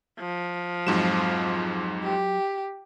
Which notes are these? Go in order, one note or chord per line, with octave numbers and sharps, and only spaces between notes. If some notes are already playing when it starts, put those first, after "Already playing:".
F3
F2 G#2 F#3 E7
G4